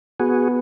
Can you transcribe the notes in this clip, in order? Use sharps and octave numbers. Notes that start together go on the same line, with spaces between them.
B3 F#4 G#4